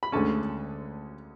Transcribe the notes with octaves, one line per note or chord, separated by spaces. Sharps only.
B5
D2 D3 G#3 C#4 A5